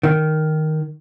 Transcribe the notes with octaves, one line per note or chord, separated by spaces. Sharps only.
D#3